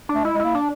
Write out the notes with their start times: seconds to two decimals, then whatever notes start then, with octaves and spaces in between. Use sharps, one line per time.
0.09 D4
0.15 A3
0.24 G#3 E4
0.34 G#3
0.40 A#3 E4
0.55 D4